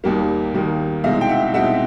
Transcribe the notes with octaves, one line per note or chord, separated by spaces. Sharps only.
D#2 D#3 G3 A#3
D#2 D#3 G3 A#3
C2 B2 G#3 C4 D#4 D#5 F5
G5
E5 F#5
C2 B2 G#3 C4 D#4 E5 F#5